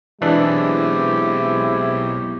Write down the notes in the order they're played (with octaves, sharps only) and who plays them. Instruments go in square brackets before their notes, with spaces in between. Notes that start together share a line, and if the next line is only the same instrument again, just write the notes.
[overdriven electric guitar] B1 [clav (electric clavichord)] E3 D4 G#4 [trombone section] G#3 C4 E4 [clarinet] G4